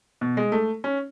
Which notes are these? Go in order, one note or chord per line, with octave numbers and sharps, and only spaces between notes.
B2
G#3
A3
C#4